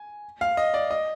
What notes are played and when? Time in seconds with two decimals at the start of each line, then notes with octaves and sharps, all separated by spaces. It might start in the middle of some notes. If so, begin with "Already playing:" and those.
Already playing: G#5
0.41 F5
0.57 D#5
0.74 D5
0.91 D#5